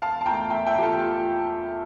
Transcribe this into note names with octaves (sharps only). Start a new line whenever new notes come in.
E1 F5 A5
A5
E2 E3 A3 G5 A#5
E1 E5 G5
E5 G5
E2 E3 A3 G4
F4 A4
F4